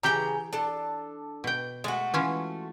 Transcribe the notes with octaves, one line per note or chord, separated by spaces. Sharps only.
C#3 E3 G4 G5 A#5
D4 A4
B2 G5
G#3 A3 F#4
E3 C#4 F4